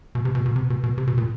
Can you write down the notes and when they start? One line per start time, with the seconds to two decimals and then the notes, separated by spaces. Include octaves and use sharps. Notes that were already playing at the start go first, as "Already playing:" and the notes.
0.15 B2
0.25 C3
0.35 B2
0.46 B2
0.56 C3
0.70 B2
0.84 B2
0.98 C3
1.07 B2
1.18 A#2